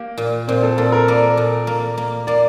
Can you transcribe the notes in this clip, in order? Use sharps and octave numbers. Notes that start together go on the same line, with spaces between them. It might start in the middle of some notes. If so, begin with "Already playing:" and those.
Already playing: A#3 G4
A#2
A#2 C4
A4
A#2 A4
A#4
A#3 D5
A#2
A#3
A#3
A#3 D5